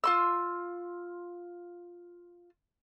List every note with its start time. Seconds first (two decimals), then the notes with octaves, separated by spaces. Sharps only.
0.04 F4 C6 E6